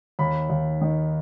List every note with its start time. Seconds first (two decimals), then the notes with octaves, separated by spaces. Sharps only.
0.19 D#2 B5
0.49 D#2
0.81 D#3